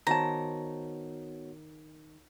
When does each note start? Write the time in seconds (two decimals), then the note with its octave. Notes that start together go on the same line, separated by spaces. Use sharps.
0.07 D#3 B3 F#4 C5 C#5 A5 A#5